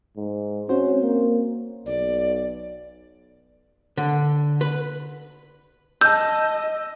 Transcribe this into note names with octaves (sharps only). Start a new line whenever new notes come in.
G#2
C4 C#4 F#4 C5
A#3
B1 D5
D3
B4
D#5 A5 E6 G6